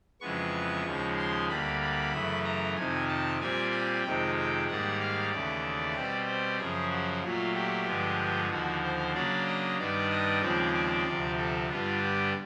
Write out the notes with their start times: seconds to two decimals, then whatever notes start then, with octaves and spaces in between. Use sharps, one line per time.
0.21 F2 C#3 E3 G#3 B3 C#6
0.85 D#2 C#3 F3 G#3
1.17 C6
1.49 D2 D3 G3 A#3 B5
1.81 B5
2.12 F#2 C#3 E3 A3
2.44 A#5
2.76 F2 C3 D#3 G#5
3.08 A5
3.40 A#2 G3 C4 G#5
3.71 G#5
4.04 F2 C3 D#3 G#3 G5
4.35 G5
4.68 G#2 D#3 G3 A#3 F#5
5.00 F5
5.31 D#2 C#3 E3 A3 D5
5.96 B2 G3 C4
6.27 C5
6.59 F#2 C#3 F3 G#4
6.90 F#4
7.23 A#2 F#3 A3 F4
7.54 G4
7.87 G2 D3 F3 G#3 B3
8.51 D#2 D3 F3 F#4
8.83 C5
9.14 C#3 F#3 A#3 D4 D5
9.47 D#5
9.78 G2 D#3 G3 B3 D4 D5
10.10 D#5
10.42 D#2 C#3 F3 G#3 C4 D5
10.74 D5
11.06 D2 C3 F3
11.38 A4
11.69 G2 D3 G3 B3 D4 F4
12.02 G4